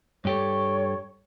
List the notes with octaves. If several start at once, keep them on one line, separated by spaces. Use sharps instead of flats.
G2 G4 A4 C#5